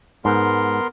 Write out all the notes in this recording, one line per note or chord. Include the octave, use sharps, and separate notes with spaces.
G#2 B3 A#4 C6